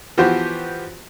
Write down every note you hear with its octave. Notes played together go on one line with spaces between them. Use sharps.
E3 F3 B3 F#4 G4 C5